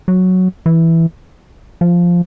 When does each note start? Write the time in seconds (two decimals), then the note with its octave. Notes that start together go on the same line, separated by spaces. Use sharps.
0.08 F#3
0.66 E3
1.81 F3